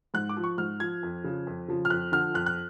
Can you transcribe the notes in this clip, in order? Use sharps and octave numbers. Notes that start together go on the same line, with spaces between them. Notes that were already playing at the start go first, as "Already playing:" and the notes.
G#2 F#6
D6
F3
C#6
G#2 F6
F3 G#6
F2
C#3 F3
F2
C#3 F3
F6
F2 F#6
D3 F3 F6
F2 F#6
F#6